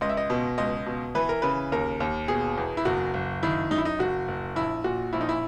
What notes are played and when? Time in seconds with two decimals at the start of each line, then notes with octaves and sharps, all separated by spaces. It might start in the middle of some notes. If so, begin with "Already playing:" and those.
0.01 C#2 D#5
0.09 E5
0.17 D#5
0.30 B2
0.58 C#2 D#5
0.86 B2
1.15 E3 B4
1.29 A#4
1.42 C#3 B4
1.72 D#2 A#4
2.00 D#2
2.28 B2 G#4
2.57 E2
2.77 E4
2.85 F#1 F#4
3.14 F#1
3.43 D#3 E4
3.71 F#2 D#4
3.78 E4
3.85 D#4
3.99 F#1 F#4
4.28 F#1
4.56 A#1 E4
4.84 A#2 F#4
5.13 A#1 E4
5.21 D#4
5.29 E4